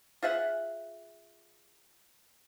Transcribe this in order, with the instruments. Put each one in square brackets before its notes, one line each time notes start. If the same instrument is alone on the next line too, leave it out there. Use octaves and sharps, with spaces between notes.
[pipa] F4 G#4 E5 F#5